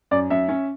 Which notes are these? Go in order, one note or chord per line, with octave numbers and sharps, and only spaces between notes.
F#2 D5
F#2 E5
C#4